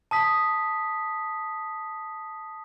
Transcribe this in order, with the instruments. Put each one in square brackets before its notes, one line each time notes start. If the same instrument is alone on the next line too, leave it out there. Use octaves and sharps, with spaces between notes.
[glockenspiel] A5 D#6 B6